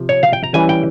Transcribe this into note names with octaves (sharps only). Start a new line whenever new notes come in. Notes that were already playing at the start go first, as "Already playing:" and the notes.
Already playing: C3 F3
C#5
F5
G5
A#5
E3 G3 C#4 G#5
G5